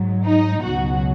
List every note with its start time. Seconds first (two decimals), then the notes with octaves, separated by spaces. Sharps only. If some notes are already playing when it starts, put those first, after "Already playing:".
Already playing: G#2 F#3
0.23 D#4
0.62 C#2 B2 F#3 F#4